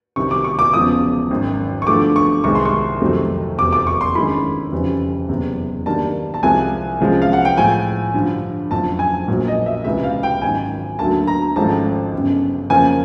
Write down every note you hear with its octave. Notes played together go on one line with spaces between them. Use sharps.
C2 C3 D#3 G3 C4 C#6
D6
C#6
D6
E1 E2 C#3 F3 D#6
G#1 F#2 D#3
C#6
G2 D3 F3 A3 D6
C#6
C2 C3 D#3 G#3 C#6
C6
C#6
F2 C3 D#3 F#3 A3
F1 E2 C3 D6
D6
C#6
C6
G2 D#3 G#3 C#4 E4 B5
F1 F2 C#3 E3 G3
F#1 E2 C3
G2 D#3 G3 A#3 D4 A5
A5
C2 C3 F3 G#3 C4 G#5
C2 C3 F3 G#3 C#4
F5
F#5
G5
A2 F3 G#3 G#5
G2 D3 F3
F#1 F2 D3 F3 A5
G#5
A#1 A#2 F#3
D#5
E5
C#2 C3 E3 E5
F5
G5
G#1 F#2 D#3 G#5
D2 D3 F#3 A#3 A5
A#5
G#1 G#2 F3 A3 C#4 A5
G1 F#2 C#3
F2 C#3 F3 A#3 C#4 G#5